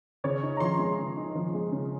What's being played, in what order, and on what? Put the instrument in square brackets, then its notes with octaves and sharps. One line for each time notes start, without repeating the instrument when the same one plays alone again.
[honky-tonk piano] C#3 C#5
D#4
A#5
F3 C6
G#3
C#3
D#4
F3
G#3
C#3